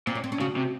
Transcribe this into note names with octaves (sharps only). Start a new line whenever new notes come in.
A#2 C4
C#4
C4
C#4
C#3 F#4
C3